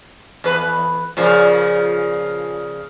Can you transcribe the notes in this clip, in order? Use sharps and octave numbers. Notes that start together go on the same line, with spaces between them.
E2 B4
A#2 C#3 F3